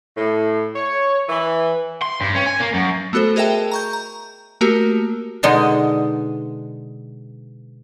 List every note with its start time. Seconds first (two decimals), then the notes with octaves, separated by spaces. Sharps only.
0.17 A2
0.75 C#5
1.29 E3
2.02 C6
2.22 G2
2.36 C#4
2.47 G#5
2.61 A#3
2.74 F#2
3.13 A3 B3 F#4 A4 C5
3.36 G#4 A#4 D#5 E5 G5 A5
3.71 A#5 C#6 G6
3.93 A#5
4.61 A3 A#3 F#4 G4 A#4
5.43 B2 D3 G#3 D#4 D#5